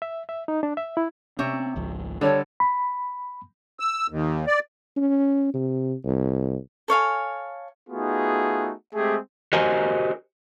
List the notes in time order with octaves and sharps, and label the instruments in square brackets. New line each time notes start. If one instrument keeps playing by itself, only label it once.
[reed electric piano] E5
E5
D#4
D4
E5
E4
[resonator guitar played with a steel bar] C3 C#5 E5 [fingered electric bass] C4 C#4
[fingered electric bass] G#1 C#2 F3
[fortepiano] D3 G3 [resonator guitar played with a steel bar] A4 [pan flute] C#5
[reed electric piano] B5
[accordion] E6
D#2
D5
[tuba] C#4
C3
C2
[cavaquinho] A4 C#5 F5 G#5
[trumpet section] A3 B3 D#4 F4 F#4 G#4
G#3 A3 C4 G4 G#4
[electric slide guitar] F#4 G4 A#4 C5 D#5 G#5